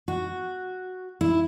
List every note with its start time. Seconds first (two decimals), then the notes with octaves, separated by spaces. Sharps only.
0.08 F#4
1.21 E4